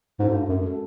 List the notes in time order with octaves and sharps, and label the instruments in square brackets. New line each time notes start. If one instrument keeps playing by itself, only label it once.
[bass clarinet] G#2 [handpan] G#3 C#4 F#4 A4
[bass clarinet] G#2
G2
F#2
[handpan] G#3 C#4 F#4 A4